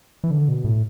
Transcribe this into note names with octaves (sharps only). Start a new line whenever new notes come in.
E3
D3
B2
A2